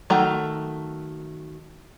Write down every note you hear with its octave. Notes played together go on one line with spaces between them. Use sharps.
D#3 F#3 A3 A#5